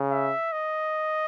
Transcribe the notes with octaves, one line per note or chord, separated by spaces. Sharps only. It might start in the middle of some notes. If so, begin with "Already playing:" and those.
Already playing: C#3
E5
D#5